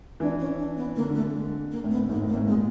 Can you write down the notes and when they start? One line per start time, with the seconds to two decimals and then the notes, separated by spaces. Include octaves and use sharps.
0.20 E3 D4
0.39 C#4
0.58 D4
0.77 B3
0.96 D3 A#3
1.09 D3
1.15 A3
1.34 G#3
1.71 A#3
1.84 A2
1.91 B3
1.97 A2
2.09 G#2 A#3
2.22 A2
2.28 A#3
2.35 A2
2.47 A#2 G#3